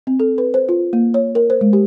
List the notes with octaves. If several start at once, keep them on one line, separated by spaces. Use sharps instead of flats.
C4
A4
B4
C5
F4
A#3
C#5
A#4
C5
G#3
G4